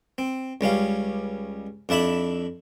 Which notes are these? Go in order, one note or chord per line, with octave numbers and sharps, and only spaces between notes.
C4
C#2 G3 C#4 F5
F2 D4 E4 E5 B5